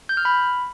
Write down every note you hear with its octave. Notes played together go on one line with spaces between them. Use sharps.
G6
F6
B5